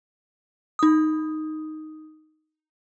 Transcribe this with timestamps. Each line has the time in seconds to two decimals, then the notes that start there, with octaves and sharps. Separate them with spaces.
0.79 D#4 D#6